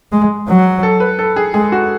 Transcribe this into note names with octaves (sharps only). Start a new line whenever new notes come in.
G#3
F#3
A4
B4
A4
G#4
G#3 G#4
F#4